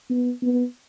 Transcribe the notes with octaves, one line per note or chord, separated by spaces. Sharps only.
B3
B3